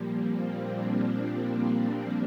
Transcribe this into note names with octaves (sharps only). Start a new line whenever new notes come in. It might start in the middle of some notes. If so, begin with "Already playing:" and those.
Already playing: A#2 F3 G3 A#3
C4
D4
D4